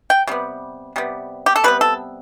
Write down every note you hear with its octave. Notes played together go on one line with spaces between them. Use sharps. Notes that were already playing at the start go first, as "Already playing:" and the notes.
G5
C3 G3 B3
C3 G3 B3
G4
A4
C3 G3 B3 B4
A4